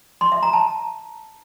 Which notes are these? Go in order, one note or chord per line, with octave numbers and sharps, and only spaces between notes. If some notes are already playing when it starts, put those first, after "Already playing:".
C6
E5
A#5
A5